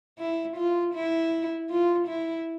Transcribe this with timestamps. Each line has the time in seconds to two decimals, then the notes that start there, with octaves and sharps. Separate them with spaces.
0.19 E4
0.57 F4
0.94 E4
1.70 F4
2.07 E4